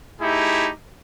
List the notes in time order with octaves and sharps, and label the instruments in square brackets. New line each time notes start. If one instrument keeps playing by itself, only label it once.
[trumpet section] A3 D#4 E4 G4 G#4